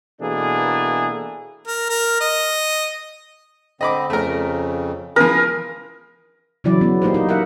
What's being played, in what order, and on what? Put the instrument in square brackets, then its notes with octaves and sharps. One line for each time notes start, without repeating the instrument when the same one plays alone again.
[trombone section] B2 E3 A#3 D4 G#4 A4
[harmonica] A#4
A#4
D#5
[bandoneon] D3 C4 [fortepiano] D#5 B5 D6
[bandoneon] F2 C#3 [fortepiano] A3 A#4
[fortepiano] C#3 E3 F3 [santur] A#4 [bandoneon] B4 D#6
[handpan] C#3 E3 F#3 E4 D5
F#3 B3
A#3 D#4 G4 C5
D#4
A#4 E5 F#5